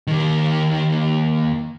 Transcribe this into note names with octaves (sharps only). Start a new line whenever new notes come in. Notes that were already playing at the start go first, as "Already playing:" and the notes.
D#2 D#3